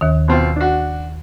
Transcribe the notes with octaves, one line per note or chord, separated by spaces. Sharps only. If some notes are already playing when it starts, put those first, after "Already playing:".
D#2 D#3
B2 C4 F4
D4 F#4